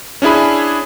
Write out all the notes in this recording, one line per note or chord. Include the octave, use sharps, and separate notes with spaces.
C#4 D4 E4 G#4 B5